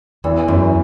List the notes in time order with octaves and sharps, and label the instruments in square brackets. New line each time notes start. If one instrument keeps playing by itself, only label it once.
[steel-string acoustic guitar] E2 [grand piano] E3
[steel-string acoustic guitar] F#2 [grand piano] E3